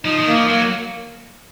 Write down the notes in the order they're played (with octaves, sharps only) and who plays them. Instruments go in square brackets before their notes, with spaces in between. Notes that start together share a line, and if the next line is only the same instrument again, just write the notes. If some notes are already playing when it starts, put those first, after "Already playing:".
[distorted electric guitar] F3 [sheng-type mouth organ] D#4
[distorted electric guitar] D#3
[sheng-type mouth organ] A#3
[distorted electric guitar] F3
[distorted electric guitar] F#3 [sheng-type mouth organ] A#3